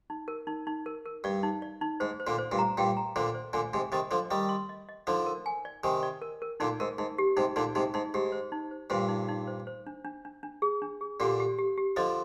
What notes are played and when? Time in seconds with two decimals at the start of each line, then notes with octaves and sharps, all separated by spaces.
0.10 D#4
0.28 A#4
0.47 D#4
0.67 D#4
0.86 A#4
1.06 A#4
1.24 G2 D5
1.43 D#4
1.62 D5
1.81 D#4
2.00 G#2 C5
2.20 C5
2.27 A#2 D3
2.38 C5
2.52 G2 A#2
2.59 A#5
2.78 G2 A#2 G5
2.97 A#5
3.16 A#2 D3 C5
3.35 C5
3.53 A#2 D3 G#5
3.73 G#2 C3 G#5
3.92 C3 D#3 D#5
4.11 D3 F3 C6
4.31 D#3 G3 D#5
4.49 C6
4.69 D#5
4.89 D#5
5.07 D3 F3 D#4
5.26 A#4
5.46 G#5
5.65 D5
5.83 C3 D#3 G#5
6.03 D5
6.22 A#4
6.42 A#4
6.60 A#2 D3 D#4
6.80 G#2 A#4
6.98 G#2 D#4
7.18 G4
7.36 G#2 C3 D#4
7.56 A#2 D3 D#4
7.75 G#2 C3 D#4
7.94 G#2 D#4
8.14 G#2 G4
8.32 C5
8.52 D#4
8.71 C5
8.90 G2 A#2 C5
9.09 D#4
9.28 D#4
9.47 C5
9.67 C5
9.87 D4
10.05 D4
10.25 D4
10.43 D4
10.62 G#4
10.82 D4
11.01 G#4
11.20 A#2 D3 G4
11.40 G4
11.59 G4
11.77 G4
11.96 D3 F3 D#5